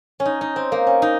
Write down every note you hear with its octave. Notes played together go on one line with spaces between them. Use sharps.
C#4
D#4
D#4
C4
A#3
C#4
D#4